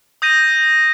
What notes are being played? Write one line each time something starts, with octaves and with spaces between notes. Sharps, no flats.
D#6 G6 A#6 D#7